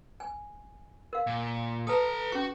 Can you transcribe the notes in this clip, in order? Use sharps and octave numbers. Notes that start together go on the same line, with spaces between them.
G#5
A#4 F5
A#2
A4 B4 A5 A#5 D#6
C#4 F#4 G#4 C#6